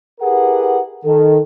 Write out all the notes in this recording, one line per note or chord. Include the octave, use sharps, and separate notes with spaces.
E4 G4 G#4 A#4 B4 F#5
D#3 A4